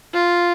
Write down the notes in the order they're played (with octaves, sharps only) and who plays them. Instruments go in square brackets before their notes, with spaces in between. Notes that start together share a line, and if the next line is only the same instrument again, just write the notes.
[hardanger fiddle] F4